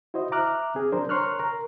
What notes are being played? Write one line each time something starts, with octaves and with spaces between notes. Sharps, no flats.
E4 F#4 C5 D#5
E5 A#5 D6 F6 F#6
C4 G#4
F#3 D4 A#4 C5
A#4 C#5 C6 C#6 F6 F#6
A#4